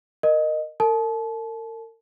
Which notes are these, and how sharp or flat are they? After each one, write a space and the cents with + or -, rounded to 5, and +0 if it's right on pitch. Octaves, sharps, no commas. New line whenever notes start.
A#4 +0 D#5 -15
A#4 -45 A5 -30